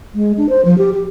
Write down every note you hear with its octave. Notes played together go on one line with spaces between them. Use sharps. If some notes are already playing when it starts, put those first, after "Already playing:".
G#3
D4
C5
F3
G4
G4